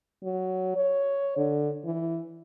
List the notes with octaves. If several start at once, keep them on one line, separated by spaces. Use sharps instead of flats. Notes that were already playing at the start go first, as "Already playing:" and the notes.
F#3
C#5
D3
E3